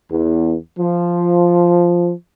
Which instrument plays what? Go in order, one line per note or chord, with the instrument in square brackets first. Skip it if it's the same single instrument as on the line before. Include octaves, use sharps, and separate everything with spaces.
[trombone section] E2
F3